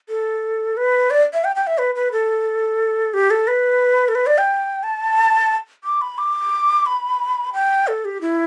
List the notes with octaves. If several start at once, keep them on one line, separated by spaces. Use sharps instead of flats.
A4
B4
D5
E5
G5
G5
E5
B4
B4
A4
G4
A4
B4
A4
B4
D5
G5
A5
D6
B5
D6
B5
G5
A4
G4
E4